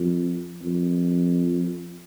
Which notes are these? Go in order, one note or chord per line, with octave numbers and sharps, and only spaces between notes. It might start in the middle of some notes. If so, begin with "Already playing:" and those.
Already playing: F2
F2